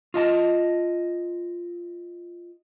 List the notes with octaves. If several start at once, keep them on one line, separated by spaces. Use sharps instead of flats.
F4 D#5 A5